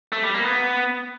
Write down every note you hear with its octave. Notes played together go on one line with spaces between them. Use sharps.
A3
G3
A#3
B3